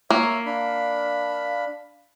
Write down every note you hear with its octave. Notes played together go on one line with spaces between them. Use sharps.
A#3 C#5 E5
D4 F5 B5